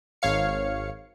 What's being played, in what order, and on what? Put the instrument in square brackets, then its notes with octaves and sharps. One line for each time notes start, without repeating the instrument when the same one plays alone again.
[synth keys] G#1 C#5 F5 C#7